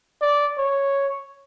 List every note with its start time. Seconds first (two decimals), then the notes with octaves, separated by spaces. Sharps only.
0.22 D5
0.58 C#5